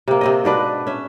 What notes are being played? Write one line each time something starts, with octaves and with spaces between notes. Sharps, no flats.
C3 A#3
C3 C4 D#5
G#2 B2 D4 B4
C#4 E5